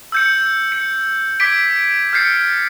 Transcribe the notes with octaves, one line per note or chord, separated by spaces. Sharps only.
E6 G6 C#7
C#7
D6 G#6 B6 D7
F6 G6 A6 C7 C#7